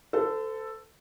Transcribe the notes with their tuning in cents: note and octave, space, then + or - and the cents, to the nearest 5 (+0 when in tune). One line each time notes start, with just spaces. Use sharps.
A4 +5 C5 -40